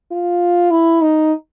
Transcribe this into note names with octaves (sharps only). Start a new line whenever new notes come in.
F4
E4
D#4